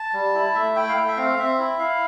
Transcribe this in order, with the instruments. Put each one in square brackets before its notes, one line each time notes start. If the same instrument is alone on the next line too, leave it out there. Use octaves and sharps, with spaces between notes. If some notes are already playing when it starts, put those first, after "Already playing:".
Already playing: [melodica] A5
G3
E4
A3 E5
E4 G5
F5
A3 G5
E5
C4 F5
C4 E5
E4
E4 F5